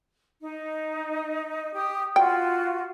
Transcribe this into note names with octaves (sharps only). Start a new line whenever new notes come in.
D#4
G4 D#6
F4 F#4 G5